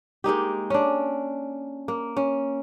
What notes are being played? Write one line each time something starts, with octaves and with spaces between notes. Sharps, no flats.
G#3 A#3 D#4 G4
C#4 D4
A#3
C#4